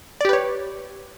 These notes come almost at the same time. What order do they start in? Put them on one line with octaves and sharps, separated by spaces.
D5 G4 B4 C#5